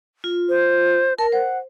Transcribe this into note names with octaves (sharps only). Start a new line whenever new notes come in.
F4
C5
A#4 A5
C5 F#5